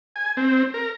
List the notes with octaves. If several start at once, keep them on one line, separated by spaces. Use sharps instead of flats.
G#5
C4
A#4